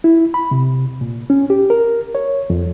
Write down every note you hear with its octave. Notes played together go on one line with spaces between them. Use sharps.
E4
B5
C3
A#2
C#4
G4
A#4
C#5
F2